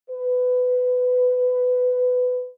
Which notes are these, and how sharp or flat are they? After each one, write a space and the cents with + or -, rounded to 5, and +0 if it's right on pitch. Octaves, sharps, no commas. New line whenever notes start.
B4 +20